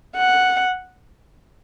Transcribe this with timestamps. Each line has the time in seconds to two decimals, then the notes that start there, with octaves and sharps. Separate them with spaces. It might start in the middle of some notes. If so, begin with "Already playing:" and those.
0.17 F#5